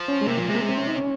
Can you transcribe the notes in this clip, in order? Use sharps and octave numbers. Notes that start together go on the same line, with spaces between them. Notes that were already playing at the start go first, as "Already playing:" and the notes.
Already playing: F3
C#4
G#3
C3 A#3
A#2 F3
C3 G#3
A#3
G#3
C4
C#4
D#4
C#4